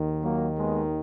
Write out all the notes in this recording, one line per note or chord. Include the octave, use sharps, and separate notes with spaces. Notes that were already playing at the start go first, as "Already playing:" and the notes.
Already playing: D#2 D#3
F#3 A#3
G#3 B3